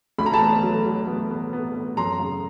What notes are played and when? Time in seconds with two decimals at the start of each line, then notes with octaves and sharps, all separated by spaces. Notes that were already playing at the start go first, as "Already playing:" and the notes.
0.18 D2 B5
0.26 A#5
0.34 A5 B5
0.41 B3
0.63 F#3
0.86 F#3
1.07 B3
1.30 B3
1.53 B3
1.75 B3
1.97 F#2 A#5 C6
2.20 C#3